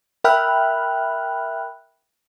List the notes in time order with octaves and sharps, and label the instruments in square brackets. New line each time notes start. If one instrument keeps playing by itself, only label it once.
[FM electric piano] A#4 E5 G5 B5 F6 F#6